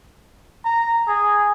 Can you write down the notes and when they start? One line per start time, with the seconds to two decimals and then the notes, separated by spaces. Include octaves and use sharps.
0.65 A#5
1.08 G#4